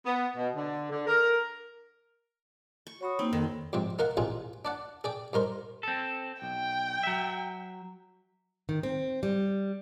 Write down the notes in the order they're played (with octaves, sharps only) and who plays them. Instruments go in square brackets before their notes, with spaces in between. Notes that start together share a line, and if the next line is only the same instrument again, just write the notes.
[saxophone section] B3
B2
D3
D3
A#4
[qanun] C#6
[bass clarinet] F#4 [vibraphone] C#5 B5 D#6
[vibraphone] A#3 D#4 [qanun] C4
[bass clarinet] F2 [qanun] D#3
[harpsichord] F2 G#2 C3 C4
D#4 A#4 F5 F#5
A1 C3 D#4 F4 G#4
D4 D5 F#5
G#4 D5 G5
G2 D#4 A#4 C5
[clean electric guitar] C4 A4
[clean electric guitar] B1 [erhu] G5
[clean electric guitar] F#3 E5
[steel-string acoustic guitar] D#3
C4
G3